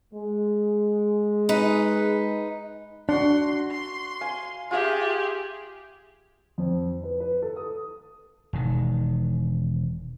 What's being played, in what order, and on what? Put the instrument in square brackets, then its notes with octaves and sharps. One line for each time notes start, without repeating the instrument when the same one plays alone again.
[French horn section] G#3
[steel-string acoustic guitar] D#4 B4
[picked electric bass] D4 [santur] F#4 F#5 [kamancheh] C6
[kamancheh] C6
[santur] F5 G#5
[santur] F4 E5 [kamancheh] G4 G#4
[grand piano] F2
B4
B4
A4
D#6
[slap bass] E1 D#3